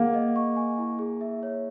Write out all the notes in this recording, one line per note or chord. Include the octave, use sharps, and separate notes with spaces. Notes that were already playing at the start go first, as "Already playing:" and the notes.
Already playing: A#3 G#4 F#5
D#5
C#6
G#5
E4
G#4
E5
C#5